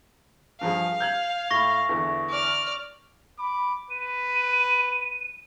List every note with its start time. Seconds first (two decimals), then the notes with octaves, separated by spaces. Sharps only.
0.61 G2 F3 G#4 F5
1.00 G6 G#6 F#7
1.51 A2 B5 C#6 A#6
1.89 E2 D3 E3
2.29 D5 F6
3.39 B5 D6
3.90 B4 D#7